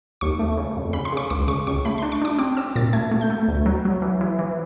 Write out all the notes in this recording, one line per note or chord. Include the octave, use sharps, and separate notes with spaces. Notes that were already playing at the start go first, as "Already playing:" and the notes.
D#2 C#6
A3
C#3
F2
C#3 B5
C6
C#3 C#6
C#2 D6
C#3 C#6
C#2 C#6
A3 B5
D4 C6
C#6
D4 D6
C4 D6
C4 E6
A#2 A6
A3 G#6
A3
G6
A3
D2
F#3
F#3
E3
E3
E3